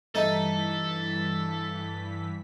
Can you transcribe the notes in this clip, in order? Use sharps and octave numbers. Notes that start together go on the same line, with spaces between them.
G2 E3 A3 D#4 A4 B6